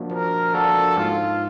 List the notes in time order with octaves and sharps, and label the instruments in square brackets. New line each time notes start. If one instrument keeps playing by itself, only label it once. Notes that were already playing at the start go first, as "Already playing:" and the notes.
Already playing: [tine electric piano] F3 A#3 D4 F#4
[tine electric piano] F3 [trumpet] A#4
[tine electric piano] A#3 D4 F#4 [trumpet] A4
[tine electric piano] G#2 [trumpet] F4